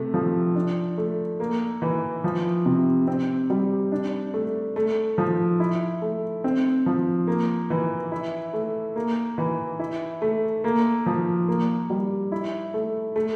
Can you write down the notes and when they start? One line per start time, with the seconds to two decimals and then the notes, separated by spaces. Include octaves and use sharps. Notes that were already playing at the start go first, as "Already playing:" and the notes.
Already playing: C3 A3
0.14 F3
0.55 D4
0.98 A3
1.40 A#3
1.82 E3
2.24 F3
2.66 C3
3.07 C4
3.50 G3
3.92 D4
4.34 A3
4.76 A3
5.18 F3
5.60 E4
6.02 A3
6.44 C4
6.86 F3
7.27 A#3
7.70 E3
8.12 E4
8.53 A3
8.96 A#3
9.38 E3
9.79 E4
10.22 A3
10.64 A#3
11.06 F3
11.48 A#3
11.90 G3
12.32 E4
12.74 A3
13.16 A3